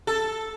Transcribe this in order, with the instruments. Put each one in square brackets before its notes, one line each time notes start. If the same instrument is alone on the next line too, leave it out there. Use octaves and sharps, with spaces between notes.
[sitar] A4